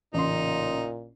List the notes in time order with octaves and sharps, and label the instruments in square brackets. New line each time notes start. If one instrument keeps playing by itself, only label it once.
[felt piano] A1 C#3 C6 [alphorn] A#2 [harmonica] D#4